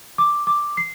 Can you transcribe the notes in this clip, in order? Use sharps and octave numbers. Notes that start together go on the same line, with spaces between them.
D6
D6
C7